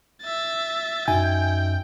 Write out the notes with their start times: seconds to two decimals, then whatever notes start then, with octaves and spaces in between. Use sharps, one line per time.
0.22 E5 A6
1.08 F#2 D#4 F#4 E5 G5 G#5